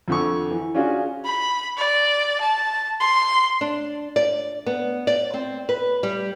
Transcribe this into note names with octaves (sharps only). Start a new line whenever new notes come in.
F2 D3 C#6
E3
C#4 D4 F4 F#4 G#4
B5
D5
A5
C6
D4
D5
B3
D5
C4
B4
G3